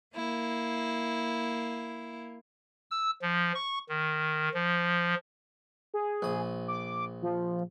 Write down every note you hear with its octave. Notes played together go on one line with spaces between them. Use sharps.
A#3 E4
E6
F3
C#6
D#3
F3
G#4
A#1 D#6
D6
F3